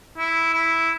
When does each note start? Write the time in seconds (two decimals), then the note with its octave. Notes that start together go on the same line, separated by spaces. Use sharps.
0.18 E4
0.53 E4